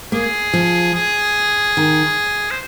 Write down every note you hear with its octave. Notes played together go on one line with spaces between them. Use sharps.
A#3 G#4
F3
G#4
D#3
C5